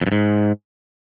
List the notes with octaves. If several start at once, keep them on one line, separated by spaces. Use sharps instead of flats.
F2
G2
G#2